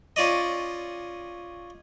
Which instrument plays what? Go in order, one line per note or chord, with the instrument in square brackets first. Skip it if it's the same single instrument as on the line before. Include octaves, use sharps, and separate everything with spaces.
[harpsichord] C#4 F4 D5 D#5